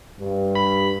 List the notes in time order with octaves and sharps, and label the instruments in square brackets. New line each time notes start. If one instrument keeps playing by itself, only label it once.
[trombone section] G2
[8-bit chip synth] B5